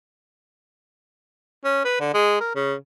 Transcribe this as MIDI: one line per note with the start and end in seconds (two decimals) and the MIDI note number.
1.65 1.84 61
1.85 1.98 71
2.00 2.11 50
2.14 2.39 56
2.40 2.53 70
2.55 2.74 49